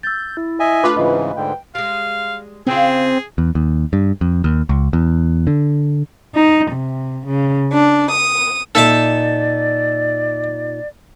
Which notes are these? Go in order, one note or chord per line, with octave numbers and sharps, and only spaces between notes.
E6 G6 A6
E4
D#5 E5 G#5
A3 D4 F4 B4 D6
G#2 C#3 E3 D#5
G#2 D3 G5
G3 G#3 F5
C#3 C4 F4 G#4
E2
D#2
G2
F2
D#2
C#2
E2
D3
D#4
C3
C#3
D4
D#6
A#2 D#4 A4 D5 E5 A5